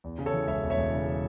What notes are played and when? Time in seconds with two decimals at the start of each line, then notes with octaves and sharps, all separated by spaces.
0.04 E2
0.18 C#3
0.26 A4 C#5
0.34 E3
0.48 E1 C#5 E5
0.63 E2
0.70 C#5 E5
0.77 E1
0.93 C#3